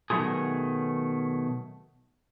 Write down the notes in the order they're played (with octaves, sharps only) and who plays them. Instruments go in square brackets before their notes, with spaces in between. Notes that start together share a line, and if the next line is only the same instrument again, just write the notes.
[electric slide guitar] B2 D#3 F#3 A3 F4 G#4